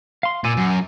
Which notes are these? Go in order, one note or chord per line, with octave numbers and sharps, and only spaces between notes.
F5 C6
A#2 G#5 D6 E6
F#2